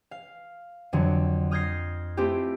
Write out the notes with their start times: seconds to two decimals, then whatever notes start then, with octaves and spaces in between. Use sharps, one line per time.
0.11 F5
0.93 F2 D3 F#3
1.51 D#6 F6 G6 G#6 A#6 C7
2.17 A3 C4 E4 F4 G4